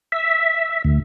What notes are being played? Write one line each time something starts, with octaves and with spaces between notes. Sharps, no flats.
E5
D2